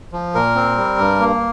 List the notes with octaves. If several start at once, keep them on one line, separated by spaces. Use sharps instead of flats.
F3
A#2 A#4
C4
G3
G2
A#3